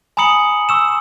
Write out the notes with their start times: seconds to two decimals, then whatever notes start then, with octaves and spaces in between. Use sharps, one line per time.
0.17 G#5 A#5 B5 D#6 C#7 F#7
0.69 C#6 E6 E7